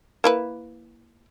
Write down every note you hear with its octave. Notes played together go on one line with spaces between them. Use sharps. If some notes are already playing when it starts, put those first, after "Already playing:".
A#3 E4 B4